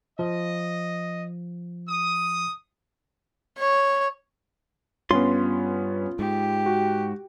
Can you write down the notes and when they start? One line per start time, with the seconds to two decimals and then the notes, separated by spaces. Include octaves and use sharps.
0.19 F3 D#5
1.88 D#6
3.58 C#5
5.11 G2 B3 C#4 F4 C#5 C6
6.19 G#2 G4
6.66 F#4